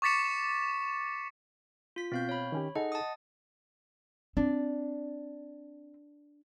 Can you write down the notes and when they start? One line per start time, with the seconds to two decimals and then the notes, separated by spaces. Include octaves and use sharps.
0.02 C#6 D6 A6 B6 C#7 E7
1.96 F4 B6
2.12 B2 C4 F5 G6
2.29 C#5 B5
2.52 D#3 C#4 G4
2.75 D#4 G#4 A4 D#5 F#5
2.92 A5 D#6
4.37 C4 D4